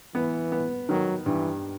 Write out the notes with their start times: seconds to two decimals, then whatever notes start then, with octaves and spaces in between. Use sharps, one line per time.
0.15 E3 B3
0.52 B3
0.89 D#3 F#3
1.26 G2 E3